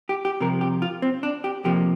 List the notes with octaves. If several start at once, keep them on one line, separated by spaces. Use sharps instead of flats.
G4
G4
C2 C3 F3 A#4
G4
F4
C4
D4
G4
F2 C3 F3 A#3 G4